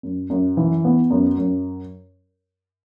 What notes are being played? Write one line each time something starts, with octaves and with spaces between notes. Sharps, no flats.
F#2
F#2
E3
B3
F#2
F#2